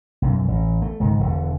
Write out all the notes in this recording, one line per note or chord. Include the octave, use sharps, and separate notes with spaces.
B1 F#2
A1
A3
C#2 G#2 D#3
E1 D3